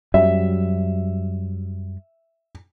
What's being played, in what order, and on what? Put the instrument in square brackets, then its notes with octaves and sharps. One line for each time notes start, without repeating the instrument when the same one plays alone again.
[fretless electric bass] F#2 F#3 G3 [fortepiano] E5